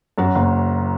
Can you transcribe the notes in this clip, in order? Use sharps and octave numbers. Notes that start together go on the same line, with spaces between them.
F#2 F#4
F#1